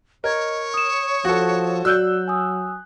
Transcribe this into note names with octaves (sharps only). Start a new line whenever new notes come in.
A#4 C#5 D#5 G#6
D#6 E7
F3 F#4 A4
F#3 F#4 D5 E6 F#6 G6
G#5 D#6